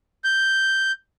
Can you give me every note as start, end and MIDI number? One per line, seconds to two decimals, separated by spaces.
0.24 0.92 91